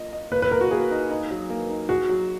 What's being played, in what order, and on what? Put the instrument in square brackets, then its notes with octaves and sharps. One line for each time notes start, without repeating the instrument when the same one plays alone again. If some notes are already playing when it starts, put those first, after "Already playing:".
Already playing: [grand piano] A#3 F4 D#5
D#5
[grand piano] A#3 [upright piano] B4
[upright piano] B4
[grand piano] A#3 [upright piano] A#4
[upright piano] F#4
[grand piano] A#3 [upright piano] G#4
[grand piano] D#4
D#4
F#3
A#3
D#4
[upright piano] F#4 [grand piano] G#4
[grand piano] F#3